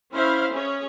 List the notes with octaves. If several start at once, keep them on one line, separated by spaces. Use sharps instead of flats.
C#4 E4 C5 E5 F5 B5
C#4 G#4 C#5